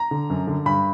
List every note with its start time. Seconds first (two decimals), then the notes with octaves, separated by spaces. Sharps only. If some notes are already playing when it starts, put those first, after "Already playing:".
Already playing: A#5
0.11 D3
0.30 F#2
0.47 D3
0.66 G2 B5